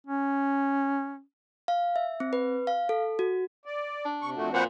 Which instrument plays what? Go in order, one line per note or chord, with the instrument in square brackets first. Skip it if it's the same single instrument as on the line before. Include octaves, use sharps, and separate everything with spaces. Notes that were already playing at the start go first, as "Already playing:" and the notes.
[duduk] C#4
[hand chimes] F5
E5
C4
B4
F5
A4
F#4
[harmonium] D5
[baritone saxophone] D4
[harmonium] C3 [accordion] C#6
[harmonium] F2 F#4 [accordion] A#2 A3
[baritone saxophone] A#2 [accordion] B4 C5 F#5